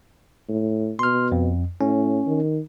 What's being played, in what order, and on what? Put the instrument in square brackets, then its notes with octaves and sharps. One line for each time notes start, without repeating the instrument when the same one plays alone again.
[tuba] A2
[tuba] B2 [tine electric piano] C6 F6
[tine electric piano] F2
[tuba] A2 [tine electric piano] C#4
[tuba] D#3